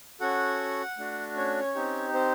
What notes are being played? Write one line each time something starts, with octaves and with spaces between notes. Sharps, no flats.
C#4 F#4 A4 F#5
A3 D4 F#4
C#4 C#5
C4 D#4 G4
C4 C5